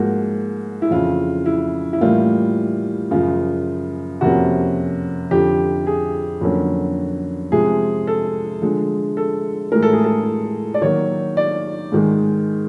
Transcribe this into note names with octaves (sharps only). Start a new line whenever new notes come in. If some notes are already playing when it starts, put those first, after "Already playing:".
Already playing: G#2 F3 A#3 F#4
E4
F2 C#3 E3 F4
E4
E4
A2 E3 G3 A#3 F4
F#2 C#3 F3 F4
F2 C3 F3 A#3 C#4 F#4
F2 D3 F3 G4
G#4
F2 D3 F#3 A#3 C#4
C3 F3 G#3 G#4
A4
D3 F3 G#3
A4
A2 E3 G#3 A#4
A4
G#4
A4
D5
D#3 F#3 A#3 C#5
D5
G#2 D#3 G#3